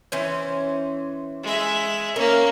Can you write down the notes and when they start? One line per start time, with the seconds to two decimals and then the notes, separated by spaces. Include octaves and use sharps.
0.12 E3 C#4 C5
1.43 G#3 E5
2.16 A#3 C#4 A#4